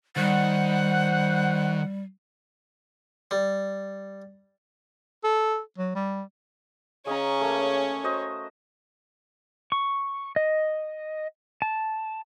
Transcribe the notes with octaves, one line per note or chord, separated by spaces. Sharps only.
D#3 G3 C5 F#5
G3
A4
F#3
G3
C#3 C#4 C#5 D#5 A#5
A3 A#3
F#4 C5 D#5
C#6
D#5
A5